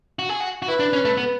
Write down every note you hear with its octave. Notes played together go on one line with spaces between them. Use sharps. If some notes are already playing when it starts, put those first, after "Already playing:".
F#4
G#4
F#4
F#4
E4 B4
D4
C#4
A3
B3